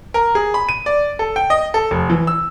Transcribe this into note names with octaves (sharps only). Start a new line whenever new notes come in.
A#4
G#4
B5
D#7
D5
A4
G5
D#5
A4
F1
E3
E6